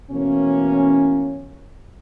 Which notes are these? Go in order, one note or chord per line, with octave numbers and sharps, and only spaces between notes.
B2 E3 A3 A#3 C#4